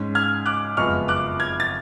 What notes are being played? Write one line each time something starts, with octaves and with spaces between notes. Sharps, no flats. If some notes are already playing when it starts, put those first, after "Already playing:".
Already playing: G#2 G#3 C#4
F6 G#6
D6 F#6
F#1 F2 F3 G#3 B3 C#6 F6
D6 F#6
F6 G#6
A6